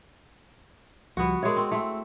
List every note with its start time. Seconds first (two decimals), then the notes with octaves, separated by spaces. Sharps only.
1.17 C#2 F3 G3 B3 F#4
1.43 G#3 A#4 C#5 E5
1.57 C4
1.71 A3 C4 E4